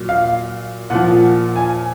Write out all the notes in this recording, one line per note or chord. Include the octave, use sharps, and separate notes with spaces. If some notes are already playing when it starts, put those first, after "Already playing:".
Already playing: A#2 F#3
F5
A#2 F3 F#5
G#5